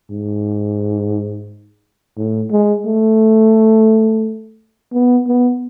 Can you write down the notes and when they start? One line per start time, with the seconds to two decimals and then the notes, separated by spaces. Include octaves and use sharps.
0.10 G#2
2.17 A2
2.52 G#3
2.86 A3
4.93 B3
5.28 B3